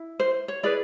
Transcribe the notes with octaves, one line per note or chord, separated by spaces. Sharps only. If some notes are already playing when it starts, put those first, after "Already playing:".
Already playing: E4
C5
C#5
E4 G#4 B4 D5